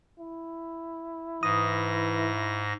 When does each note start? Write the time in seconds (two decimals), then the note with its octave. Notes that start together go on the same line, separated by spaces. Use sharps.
0.19 E4
1.43 G#2 E3 D#6 A#6